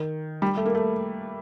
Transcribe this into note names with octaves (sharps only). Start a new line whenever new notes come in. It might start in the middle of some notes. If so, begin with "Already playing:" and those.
Already playing: D#3
G3
A3
A#3
A3